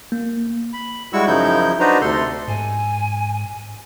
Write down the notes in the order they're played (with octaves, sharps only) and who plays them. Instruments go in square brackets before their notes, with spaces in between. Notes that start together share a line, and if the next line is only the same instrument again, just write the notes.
[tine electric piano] A#3
[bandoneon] B5
G3 G#3 E4 F#4 C#6 E6
F#2 C#3 F3 D#4 E4 G6
D4 D#4 F#4 B4 C5 A#5
D2 C3 A4 C6
[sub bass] G#2 [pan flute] G#5